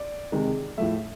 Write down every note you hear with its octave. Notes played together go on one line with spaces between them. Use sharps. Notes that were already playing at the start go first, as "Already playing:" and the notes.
Already playing: D5
C3 D#3 G#3
A2 F3 A3 E5